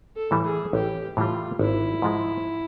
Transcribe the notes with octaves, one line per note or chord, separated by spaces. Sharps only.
A4
A2 E3 G3
G#4
A1 G4
A2 E3 G3 F4
G#1 E4
G#2 F3 G#3